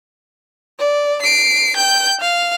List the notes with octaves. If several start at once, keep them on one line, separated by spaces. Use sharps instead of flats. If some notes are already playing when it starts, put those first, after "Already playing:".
D5
C7 D7
G5 G6
F5